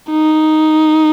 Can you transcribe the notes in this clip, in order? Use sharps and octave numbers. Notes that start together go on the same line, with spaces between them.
D#4